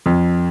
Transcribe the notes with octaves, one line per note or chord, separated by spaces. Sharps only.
F2